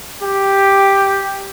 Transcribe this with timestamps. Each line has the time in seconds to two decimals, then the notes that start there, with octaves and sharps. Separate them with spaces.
0.21 G4